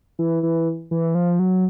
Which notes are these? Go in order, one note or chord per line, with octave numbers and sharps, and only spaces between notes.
E3
E3
E3
F3
F#3